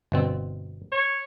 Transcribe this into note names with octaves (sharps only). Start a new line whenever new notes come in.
G1 B2 C4
C#5